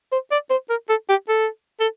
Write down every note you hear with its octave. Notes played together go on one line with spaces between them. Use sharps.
C5
D5
C5
A#4
A4
G4
A4
A4